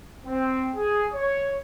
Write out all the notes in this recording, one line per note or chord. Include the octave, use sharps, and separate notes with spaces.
C4
G#4
C#5